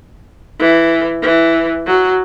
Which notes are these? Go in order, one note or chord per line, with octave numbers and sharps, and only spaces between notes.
E3
E3
F#3